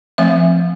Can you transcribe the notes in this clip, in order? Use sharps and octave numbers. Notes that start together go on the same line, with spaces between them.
F3 A3 C4 E5